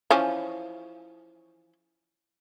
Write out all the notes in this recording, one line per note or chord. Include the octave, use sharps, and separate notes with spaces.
E3 F3 C#4